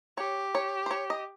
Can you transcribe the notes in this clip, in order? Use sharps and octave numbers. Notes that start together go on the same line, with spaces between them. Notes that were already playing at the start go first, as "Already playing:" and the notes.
G4 C#5
C#5
C5
C#5
D#5